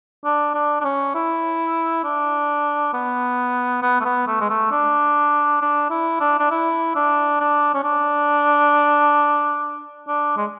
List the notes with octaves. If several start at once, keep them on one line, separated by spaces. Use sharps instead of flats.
D4
D4
D4
C#4
E4
D4
B3
B3
A3
B3
A3
G#3
A3
D4
D4
E4
D4
D4
E4
D4
D4
C#4
D4
D4
G#3